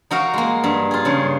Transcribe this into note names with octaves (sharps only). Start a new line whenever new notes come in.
D#4 F#4 A#4 F5
G#3 A#3
G2
F4 G#4
G2 C#3